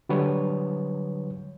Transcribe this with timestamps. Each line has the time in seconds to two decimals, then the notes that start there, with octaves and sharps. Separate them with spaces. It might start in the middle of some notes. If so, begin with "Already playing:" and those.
0.09 D3 F#3 G3 B4 C#5